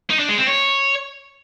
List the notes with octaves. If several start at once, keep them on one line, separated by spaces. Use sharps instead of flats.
D#4
D4
G#3
C4
C#5